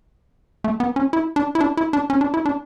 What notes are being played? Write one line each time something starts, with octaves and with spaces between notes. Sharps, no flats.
A3
B3
C#4
E4
D4
E4
D4
E4
D4
C#4
D4
E4
D4